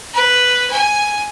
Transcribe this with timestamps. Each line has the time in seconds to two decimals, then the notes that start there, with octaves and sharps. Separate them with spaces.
0.13 B4
0.70 G#5